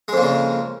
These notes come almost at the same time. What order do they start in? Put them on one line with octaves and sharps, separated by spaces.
G#3 F2 A#2 C#3